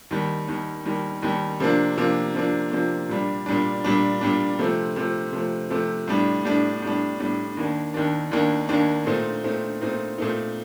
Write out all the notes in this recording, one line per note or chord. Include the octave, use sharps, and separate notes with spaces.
D#2 D#3 G3
D#2 D#3 G3
D#2 D#3 G3
D#2 D#3 G3
C3 F3 A#3 D4
C3 F3 A#3 D4
C3 F3 A#3 D4
C3 F3 A#3 D4
A#2 G3 D4
A#2 G3 D4
A#2 G3 D4
A#2 G3 D4
C3 F3 A3 C4
C3 F3 A3 C4
C3 F3 A3 C4
C3 F3 A3 C4
A2 G3 D4
A2 G3 D4
A2 G3 D4
A2 G3 D4
D#2 D#3 A#3 D4
D#2 D#3 A#3 D4
D#2 D#3 A#3 D4
D#2 D#3 A#3 D4
A#2 A3 C4 D#4
A#2 A3 C4 D#4
A#2 A3 C4 D#4
A#2 A3 C4 D#4